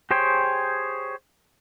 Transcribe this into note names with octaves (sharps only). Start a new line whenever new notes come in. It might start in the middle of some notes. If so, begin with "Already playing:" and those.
G4 G#4 C5 C#5 G5